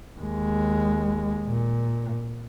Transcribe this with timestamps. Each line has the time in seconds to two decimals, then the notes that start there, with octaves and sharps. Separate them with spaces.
0.20 D#2 G#3
1.46 A#2